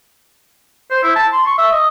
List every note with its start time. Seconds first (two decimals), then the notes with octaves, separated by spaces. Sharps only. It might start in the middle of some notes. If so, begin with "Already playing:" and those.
0.91 C5
1.03 E4
1.16 A5
1.33 C6
1.46 C#6
1.58 E5
1.72 D#5